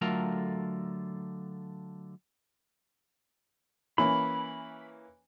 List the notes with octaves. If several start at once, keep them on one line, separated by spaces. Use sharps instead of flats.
D3 F#3 A3 F4 A#4 A#5
E3 A#3 C#4 B5